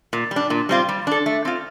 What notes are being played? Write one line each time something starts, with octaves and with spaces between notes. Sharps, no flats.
A#2
G3
D4
A#2
G3 C4 F4
G3
D4 A4
A3
C4 F4